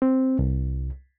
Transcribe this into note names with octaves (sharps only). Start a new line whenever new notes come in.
C4
C2